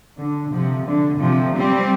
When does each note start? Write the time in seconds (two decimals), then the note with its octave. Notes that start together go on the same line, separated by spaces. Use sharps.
0.19 D3
0.53 C3 F3
0.88 D3
1.21 C3 F3
1.57 G3 C4